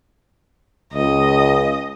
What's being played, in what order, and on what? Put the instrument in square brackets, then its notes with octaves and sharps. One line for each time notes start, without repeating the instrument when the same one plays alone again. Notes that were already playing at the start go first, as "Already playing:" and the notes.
[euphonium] C#2 [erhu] D#5